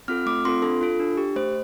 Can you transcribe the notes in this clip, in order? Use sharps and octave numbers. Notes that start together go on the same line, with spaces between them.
C4 F4 A4 F6
A3 D6
C4 F4 A4 C6
D4 A4
F4 A4
D4
G4
A3 C5